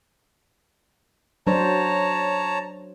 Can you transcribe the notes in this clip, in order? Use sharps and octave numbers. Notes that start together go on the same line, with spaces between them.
F#3 D4 C5 C#5 A5 A#5